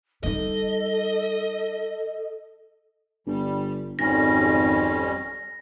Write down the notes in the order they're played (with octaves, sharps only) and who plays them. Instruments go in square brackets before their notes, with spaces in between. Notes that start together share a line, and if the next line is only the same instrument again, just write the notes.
[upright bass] G3 D#4 [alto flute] A4 [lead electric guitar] D#5
[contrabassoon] G1 [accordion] G3
[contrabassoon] G#1 [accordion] F2 G3 C#4 [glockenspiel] A#6